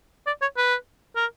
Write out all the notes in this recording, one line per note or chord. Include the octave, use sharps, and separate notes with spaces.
D5
C#5
B4
A#4